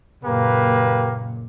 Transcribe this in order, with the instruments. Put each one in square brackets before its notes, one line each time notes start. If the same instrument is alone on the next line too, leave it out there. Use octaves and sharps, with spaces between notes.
[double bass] F#1 A#2 [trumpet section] A#3 G4 B4